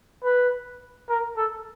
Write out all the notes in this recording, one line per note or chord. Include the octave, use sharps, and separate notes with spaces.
B4
A#4
A4